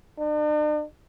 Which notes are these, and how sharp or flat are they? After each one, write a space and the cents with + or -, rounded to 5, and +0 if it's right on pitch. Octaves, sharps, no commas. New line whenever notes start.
D4 +45